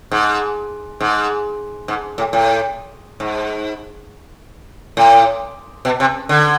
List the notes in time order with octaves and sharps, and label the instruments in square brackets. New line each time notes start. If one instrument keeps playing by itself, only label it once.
[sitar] G#2
G#2
G#2
A2
A2
G#2
A2
B2
C3
D3